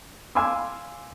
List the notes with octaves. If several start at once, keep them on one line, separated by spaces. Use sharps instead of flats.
F5 G#5 C6 D6 E6